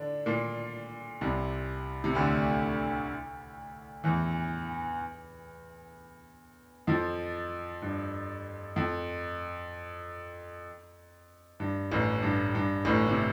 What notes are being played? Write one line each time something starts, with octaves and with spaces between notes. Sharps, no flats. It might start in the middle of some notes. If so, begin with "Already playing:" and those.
Already playing: D3 D4
A#2 A#3
C2 C3
C3
D2 D3
E2 E3
F2 F3
G2
F2
G2
A1 A2
G2
G2
A1 A2
C3